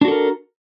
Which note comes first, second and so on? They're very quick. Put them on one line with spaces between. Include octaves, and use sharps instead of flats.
D4 F#4 A4 A#4